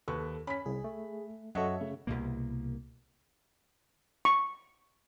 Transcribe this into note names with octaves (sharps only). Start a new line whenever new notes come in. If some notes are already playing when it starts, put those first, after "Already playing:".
D#2 A4 B4 C#6
C#4 B5 B6
C2 G#4
A3
F#2 F#4 A4 C#5 D#5 E5 F#5 C#6
C#3 A3
C2 F#2 B2 A#3
C#6